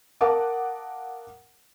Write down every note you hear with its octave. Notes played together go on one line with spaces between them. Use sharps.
A#4 F5 F#5 A5 D6 D#6